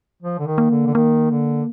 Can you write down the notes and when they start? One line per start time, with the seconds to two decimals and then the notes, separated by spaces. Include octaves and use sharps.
0.22 F3
0.39 D3
0.46 D#3
0.58 A#3
0.70 D3
0.86 D3
0.94 D#3 A#3
1.30 D3